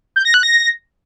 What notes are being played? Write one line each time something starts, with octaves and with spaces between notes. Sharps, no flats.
G6
A#6
F#6
A#6